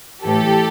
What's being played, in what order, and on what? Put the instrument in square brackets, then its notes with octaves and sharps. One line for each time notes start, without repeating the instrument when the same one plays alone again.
[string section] A2 E3 G4 A4